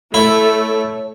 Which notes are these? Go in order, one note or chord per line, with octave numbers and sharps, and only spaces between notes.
A3 E4 C#5